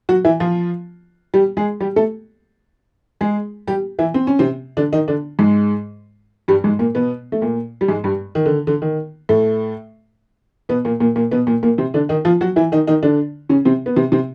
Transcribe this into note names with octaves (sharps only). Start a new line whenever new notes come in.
F#3 F#4
E3 E4
F3 F4
G3 G4
G#3 G#4
G3 G4
A3 A4
G#3 G#4
G3 G4
E3 E4
C4
C#4
C3 C4
D3 D4
D#3 D#4
D3 D4
G#2 G#3
G2 G3
G#2 G#3
A#2 A#3
B2 B3
A3
A#2 A#3
G3
G#2 G#3
G2 G3
D#3
D3
D3
D#3
A2 A3
B2 B3
A#2 A#3
A#2 A#3
A#2 A#3
B2 B3
A#2 A#3
A#2 A#3
C3 C4
D3 D4
D#3 D#4
F3 F4
F#3 F#4
E3 E4
D#3 D#4
D#3 D#4
D3 D4
C#3 C#4
C3 C4
B3
C3 C4
C3 C4